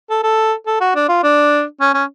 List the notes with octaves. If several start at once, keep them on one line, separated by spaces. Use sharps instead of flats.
A4
A4
A4
F#4
D4
F4
D4
C#4
C#4